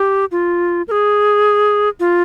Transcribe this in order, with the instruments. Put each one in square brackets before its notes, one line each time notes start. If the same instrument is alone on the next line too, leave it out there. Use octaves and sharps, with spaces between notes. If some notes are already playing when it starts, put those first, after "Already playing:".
Already playing: [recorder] G4
F4
A#4
G#4
F4